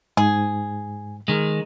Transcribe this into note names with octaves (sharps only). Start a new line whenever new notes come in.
G#2 G#4
D#3 G#3